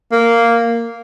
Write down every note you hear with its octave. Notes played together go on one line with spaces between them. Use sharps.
A#3